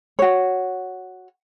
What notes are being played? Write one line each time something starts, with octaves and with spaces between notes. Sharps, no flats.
F#4 C#5